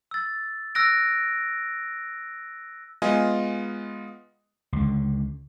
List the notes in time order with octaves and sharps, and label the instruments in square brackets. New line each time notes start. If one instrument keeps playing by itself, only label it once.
[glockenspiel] E6 A6
E6 F#6 A#6 D7
[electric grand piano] G#3 B3 F4 D#5 G#5
[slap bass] C#2 D3